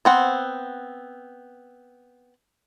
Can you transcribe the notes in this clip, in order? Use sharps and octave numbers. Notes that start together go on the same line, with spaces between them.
B3 C4 F#5